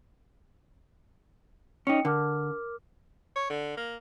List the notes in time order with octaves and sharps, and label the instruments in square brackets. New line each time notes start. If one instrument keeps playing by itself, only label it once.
[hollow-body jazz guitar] C#4 D#4 [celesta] G5 C#7
[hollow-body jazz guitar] D3 [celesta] A#4 D6 F6
[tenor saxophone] C#5
D3
A#3